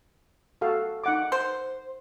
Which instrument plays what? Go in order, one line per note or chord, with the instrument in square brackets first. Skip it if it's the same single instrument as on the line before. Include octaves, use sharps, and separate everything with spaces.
[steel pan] F#4 A4 F5
D#4 F#5 D6
[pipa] C5